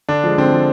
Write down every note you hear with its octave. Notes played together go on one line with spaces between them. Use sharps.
D3 D4
F3 G#3
D3 C4
F3 G#3